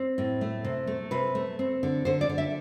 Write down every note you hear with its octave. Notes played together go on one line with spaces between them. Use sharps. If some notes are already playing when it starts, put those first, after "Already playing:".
Already playing: C4
A2
A3
C3
A3
C3 B4
A3
C4
D3
D3 C5
D5
D3
E5